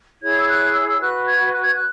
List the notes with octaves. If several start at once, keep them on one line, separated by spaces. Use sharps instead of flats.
E4 G#4 C#5 G#6
E6
F#6
E6
E6
F#4 B4 F#6
G#6
F#6
G#6
F#6